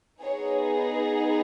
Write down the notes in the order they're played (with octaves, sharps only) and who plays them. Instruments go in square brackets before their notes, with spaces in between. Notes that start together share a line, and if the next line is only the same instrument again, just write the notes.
[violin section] B3 D#4 G#4 C#5